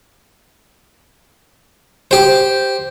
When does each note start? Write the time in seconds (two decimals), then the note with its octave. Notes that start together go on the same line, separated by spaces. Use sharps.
2.11 G4 C5